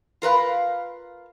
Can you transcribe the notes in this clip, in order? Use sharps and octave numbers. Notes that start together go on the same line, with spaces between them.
F4 A#4 B4 F5